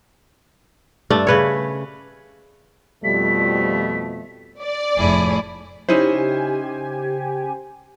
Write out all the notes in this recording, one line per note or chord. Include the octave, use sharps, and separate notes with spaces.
G2 A3 D4
C#3 B4 C#5
F2 B2 F3 G3 A3 B6
D5
F1 F2 A2 E4 G#4
C#3 C#4 D#4 E4 G4 C5 G#5